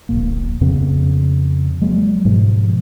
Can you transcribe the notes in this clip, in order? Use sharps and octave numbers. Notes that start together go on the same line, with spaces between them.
D1 A#1 A#2 A#3
F2 C#3 B3 C4
F#3 G#3 A#3
G#2 B2 F3